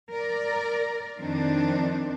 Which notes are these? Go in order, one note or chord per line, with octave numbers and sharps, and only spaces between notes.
A#4 D5
F2 D#3 C4 D4